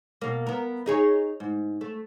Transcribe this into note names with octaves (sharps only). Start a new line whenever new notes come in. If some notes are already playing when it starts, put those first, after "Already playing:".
B2 A#3
B3 A#4
D#4 G#4 C#5
G#2
A3